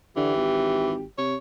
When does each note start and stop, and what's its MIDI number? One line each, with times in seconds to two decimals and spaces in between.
0.17 0.36 50
0.17 0.94 52
0.17 1.06 67
0.36 1.05 32
1.18 1.35 48
1.18 1.37 73